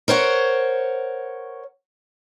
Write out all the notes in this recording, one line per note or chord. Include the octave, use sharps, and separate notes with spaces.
A#4 C5 C#5 F#5